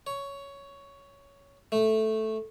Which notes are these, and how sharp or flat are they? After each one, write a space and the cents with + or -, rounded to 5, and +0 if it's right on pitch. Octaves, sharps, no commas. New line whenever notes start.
C#5 +10
A3 -5